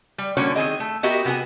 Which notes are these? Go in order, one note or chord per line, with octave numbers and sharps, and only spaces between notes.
G3
D3 G3 A#3 C#4 F#4 C#5
D#3 C4 G#4 D#5
A3
B3 F#4 G4 A#4 D#5 E5
C3 B3 F4 F#4 G#4